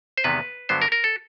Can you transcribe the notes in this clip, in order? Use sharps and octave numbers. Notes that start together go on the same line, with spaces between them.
C5
E2 C3 D#3 G#3 B3 B4
G2 D3 F#3 B3 C5
A#4
A#4
A4